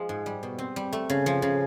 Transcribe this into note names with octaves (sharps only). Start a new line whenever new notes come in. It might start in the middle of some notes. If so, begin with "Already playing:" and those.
Already playing: F3 G#3
G#2
G3
B2
C4
G3
A3
C#3
F3
C#3